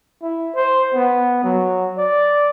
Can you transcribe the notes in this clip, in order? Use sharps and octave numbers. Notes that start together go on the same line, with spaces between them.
E4
C5
B3
F#3
D5